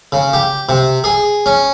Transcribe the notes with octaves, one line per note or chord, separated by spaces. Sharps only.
C#3
G4
C3
G#4
C#4